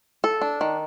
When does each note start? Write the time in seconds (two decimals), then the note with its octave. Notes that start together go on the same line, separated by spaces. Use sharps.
0.24 A4
0.42 D4
0.61 D#3